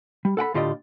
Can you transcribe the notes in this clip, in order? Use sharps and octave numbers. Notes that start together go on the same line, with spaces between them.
G3
A4 F#5 G5 B5
A2 D3 F4 G4 D5 D#5